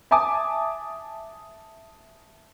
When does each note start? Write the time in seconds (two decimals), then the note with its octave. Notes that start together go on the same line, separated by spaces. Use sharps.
0.11 E5 G#5 A5 D6 D#6